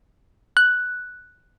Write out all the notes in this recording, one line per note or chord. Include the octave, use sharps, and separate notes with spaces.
F#6